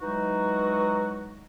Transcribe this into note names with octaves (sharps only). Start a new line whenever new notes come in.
E3 F#3 G#3 D#4 F#4